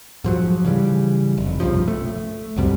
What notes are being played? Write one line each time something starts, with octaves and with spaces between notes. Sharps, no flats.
G#2 F3 F#3
C#3 E3 G3
F1
B1 G2 C#3 F3
A3
C2 F#2 C3 G3